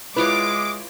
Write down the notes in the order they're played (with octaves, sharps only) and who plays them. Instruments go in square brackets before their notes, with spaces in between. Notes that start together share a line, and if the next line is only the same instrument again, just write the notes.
[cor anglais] G#3 [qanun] E4 F4 C#5 [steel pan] B4 [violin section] D6